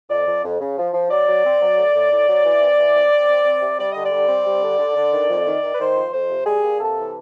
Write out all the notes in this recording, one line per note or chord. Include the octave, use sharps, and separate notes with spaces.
F2 D5
F2
F2
C#3
F3
F3
F#3 D5
F#3
C4
F#3
A3
A2
A2
F#3
E3
C4
E3
C4
C4
C4
C4
C3
G3 D5
D3 D#5
D5
G3
C4
G3
D3
D3
D3
D#3
F2
D#3
D#3
B4
D#3 C5
F2
F2 C5
C3
G3 G#4
A#3
C3 A4
E3